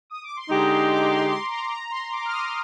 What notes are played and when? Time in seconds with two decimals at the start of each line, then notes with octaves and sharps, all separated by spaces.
0.10 D#6
0.23 D6
0.36 C6
0.50 D3 G#3 D#4 G4 A#5
0.70 C6
0.90 D6
1.11 C6
1.31 C6
1.52 A#5
1.71 A#5
1.91 C6
2.12 D6
2.25 F6
2.32 D#6